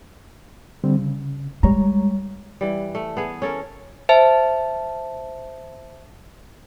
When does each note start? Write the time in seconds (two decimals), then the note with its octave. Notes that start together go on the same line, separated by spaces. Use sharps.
0.84 D3 G3 C4
0.99 C#3
1.63 G3 G#3 C#5 A#5
2.61 E3 G3
2.95 A3
3.17 B3 G#4
3.42 C#4 A4 A#4
4.09 C5 E5 A5